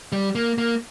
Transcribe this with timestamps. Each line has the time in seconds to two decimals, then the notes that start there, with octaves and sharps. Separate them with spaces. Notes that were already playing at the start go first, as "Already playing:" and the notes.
0.12 G3
0.35 A#3
0.58 A#3